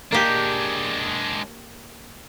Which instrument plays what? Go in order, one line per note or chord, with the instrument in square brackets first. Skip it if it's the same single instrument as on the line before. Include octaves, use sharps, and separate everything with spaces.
[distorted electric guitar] G#3 D4 [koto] A#3 G4